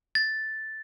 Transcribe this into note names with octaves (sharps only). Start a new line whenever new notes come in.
A6